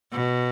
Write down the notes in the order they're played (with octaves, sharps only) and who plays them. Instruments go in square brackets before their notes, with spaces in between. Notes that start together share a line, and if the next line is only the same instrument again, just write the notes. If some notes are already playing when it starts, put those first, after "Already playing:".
[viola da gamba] B2